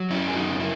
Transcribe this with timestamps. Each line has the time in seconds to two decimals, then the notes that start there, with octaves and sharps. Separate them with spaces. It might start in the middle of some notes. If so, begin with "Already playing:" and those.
Already playing: F#3
0.10 F#2 C#4 E4
0.28 F#2 G#4
0.35 D#4 F#4
0.48 C#3
0.60 E4